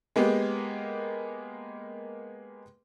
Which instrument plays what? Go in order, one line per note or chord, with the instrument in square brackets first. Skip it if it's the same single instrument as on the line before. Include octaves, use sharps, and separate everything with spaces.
[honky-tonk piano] G#3 A#3 B3 G4